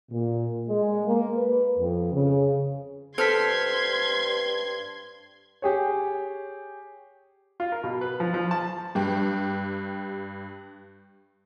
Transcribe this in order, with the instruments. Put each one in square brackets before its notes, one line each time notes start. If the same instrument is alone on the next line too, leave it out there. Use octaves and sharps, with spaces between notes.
[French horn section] A#2
G#3
A#3
B4
F2
C#3
[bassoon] G2 [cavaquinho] A4 [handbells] C5 F6 B6 [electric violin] C6 G#6
[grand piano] G4 G#4 C#5
[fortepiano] F4
A#4
B2
B4
F3
F3
A5
[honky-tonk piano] G2 G4